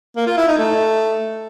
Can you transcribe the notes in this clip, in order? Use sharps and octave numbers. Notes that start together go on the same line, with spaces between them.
A#3
F4
E4
D#4
A3